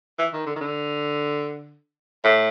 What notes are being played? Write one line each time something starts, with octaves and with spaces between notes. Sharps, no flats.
E3
D#3
D3
D#3
D3
A2